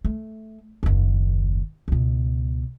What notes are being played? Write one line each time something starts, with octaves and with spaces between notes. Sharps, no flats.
A3
F#1 D#2
C#2 B2